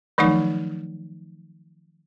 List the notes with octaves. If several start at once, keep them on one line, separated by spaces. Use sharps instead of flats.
D#3 F3 F#3 A3 D#4